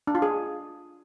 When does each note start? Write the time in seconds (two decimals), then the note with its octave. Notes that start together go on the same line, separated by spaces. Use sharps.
0.07 D4
0.15 F4
0.22 G#4